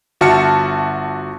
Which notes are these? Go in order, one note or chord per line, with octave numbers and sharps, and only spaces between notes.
G1 F#4 E5 A5 F6 C#7